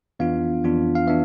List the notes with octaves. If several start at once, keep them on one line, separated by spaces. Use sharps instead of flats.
F2 E3 B3 D4 F4 F5
F2 E3 B3 D4 F4
F5
E3 B3 D4 E5